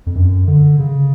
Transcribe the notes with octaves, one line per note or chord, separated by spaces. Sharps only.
F2
F#2
D3
C#3